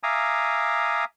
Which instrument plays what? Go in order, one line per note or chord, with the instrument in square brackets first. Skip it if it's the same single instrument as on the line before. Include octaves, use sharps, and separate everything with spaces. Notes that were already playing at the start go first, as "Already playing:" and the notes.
[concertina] E5 F5 G#5 A#5 D6 D#6